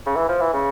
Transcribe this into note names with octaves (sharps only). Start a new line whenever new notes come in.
C#3
E3
F3
E3
C#3